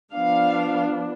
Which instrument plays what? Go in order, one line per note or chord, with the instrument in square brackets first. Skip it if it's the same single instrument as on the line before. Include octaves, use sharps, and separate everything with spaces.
[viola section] F3 B3 D4 F5